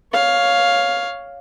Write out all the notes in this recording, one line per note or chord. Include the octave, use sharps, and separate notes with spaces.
C#5 F5